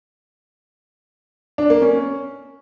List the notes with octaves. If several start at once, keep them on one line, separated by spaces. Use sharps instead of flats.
D4
A#3
C#4